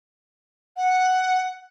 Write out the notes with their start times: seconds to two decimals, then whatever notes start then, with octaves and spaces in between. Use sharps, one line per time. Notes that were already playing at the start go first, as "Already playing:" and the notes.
0.77 F#5